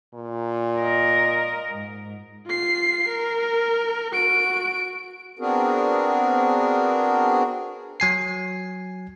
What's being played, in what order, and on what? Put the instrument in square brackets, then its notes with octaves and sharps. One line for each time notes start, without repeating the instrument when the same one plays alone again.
[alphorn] A#2
[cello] A#4 D#5
G#2
[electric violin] F4 C7
A#4
F#4 D7
[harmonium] B3 C4 D4 F#4 G#4 A#4
[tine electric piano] F#3 G#5 C7